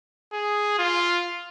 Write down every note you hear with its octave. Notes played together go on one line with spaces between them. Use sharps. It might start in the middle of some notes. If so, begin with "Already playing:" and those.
G#4
F4